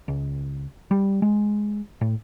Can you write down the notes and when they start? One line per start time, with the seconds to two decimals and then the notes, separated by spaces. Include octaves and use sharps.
0.08 C#2
0.91 G3
1.22 G#3
2.01 A2